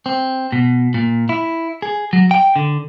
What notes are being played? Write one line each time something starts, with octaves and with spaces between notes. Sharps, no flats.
C4
B2
A#2
E4
G#4
F#3
G5
D3